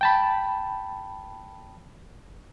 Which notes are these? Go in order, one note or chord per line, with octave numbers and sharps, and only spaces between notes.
G5 A5 B5